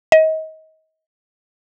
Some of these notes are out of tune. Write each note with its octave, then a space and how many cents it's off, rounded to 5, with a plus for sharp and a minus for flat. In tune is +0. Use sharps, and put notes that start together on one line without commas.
D#5 +30